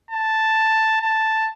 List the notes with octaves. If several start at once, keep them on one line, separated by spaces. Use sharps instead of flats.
A5
A5